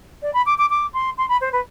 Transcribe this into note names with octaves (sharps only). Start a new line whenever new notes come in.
D5
B5
D6
D6
D6
C6
C6
B5
C5
B4